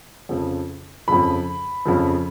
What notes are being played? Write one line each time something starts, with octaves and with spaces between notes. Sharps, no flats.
F2 C#3 F3
F2 C#3 F3 B5
F2 C#3 F3